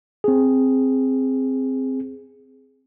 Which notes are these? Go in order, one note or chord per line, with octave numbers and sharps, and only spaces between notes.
C4 G#4